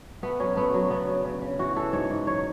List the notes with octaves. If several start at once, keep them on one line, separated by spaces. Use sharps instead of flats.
A3 B3
F#3 C#4
A3 B3
F#3
C#3 B3
C#3
C#3
C#3
E3 F#4
E3 A4
G#2 C#5
G#2
F#3 C#5